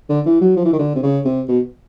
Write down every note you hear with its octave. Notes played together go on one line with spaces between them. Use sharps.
D3
E3
F#3
F3
E3
D#3
D3
C3
C#3
C3
B2